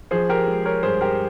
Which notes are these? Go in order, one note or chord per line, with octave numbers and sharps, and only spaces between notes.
F3 G#4 C5
G4 A#4
G#3
A#4 C#5
G2 G#4 C5
G4 A#4